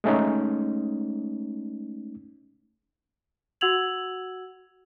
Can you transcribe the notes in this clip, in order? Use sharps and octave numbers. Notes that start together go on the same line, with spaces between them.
G#3 A3 C#4 D#4
F#4 F#5 E6 G#6 F7 F#7